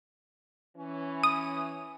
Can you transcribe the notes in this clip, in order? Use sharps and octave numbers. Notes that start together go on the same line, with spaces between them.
E3 C#4
D#6